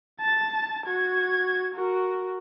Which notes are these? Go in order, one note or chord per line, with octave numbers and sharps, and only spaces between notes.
A5 A6
F#4 G#6
F#4 A#4